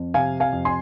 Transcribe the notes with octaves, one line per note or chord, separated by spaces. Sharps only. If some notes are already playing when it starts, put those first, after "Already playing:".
Already playing: F2
C3 F5 G#5
F5 G#5
F2
G#5 C6